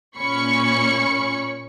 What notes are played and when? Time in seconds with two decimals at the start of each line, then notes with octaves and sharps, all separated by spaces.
0.17 A#2 C#4 B5 C#6 C#7